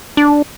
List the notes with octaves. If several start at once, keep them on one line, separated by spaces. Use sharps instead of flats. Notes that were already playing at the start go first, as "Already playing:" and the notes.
D4